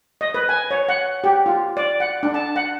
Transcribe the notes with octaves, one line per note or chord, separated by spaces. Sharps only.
D#5
B4
G#5
C#5
F#5
G4
F4
D5
F#5
D4
A5
F#5